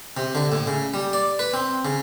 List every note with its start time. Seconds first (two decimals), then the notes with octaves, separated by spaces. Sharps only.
0.17 C3
0.35 D3
0.52 A2
0.67 C#3
0.94 G3
1.13 D5
1.39 B4
1.54 C4
1.85 C#3